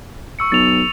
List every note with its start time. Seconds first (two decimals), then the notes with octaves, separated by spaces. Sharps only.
0.39 C#6 E6 C#7
0.52 B1 A6 F7